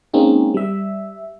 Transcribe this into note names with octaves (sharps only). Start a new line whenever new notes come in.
G#3 A#3 C4 C#4 D#4
G3 E5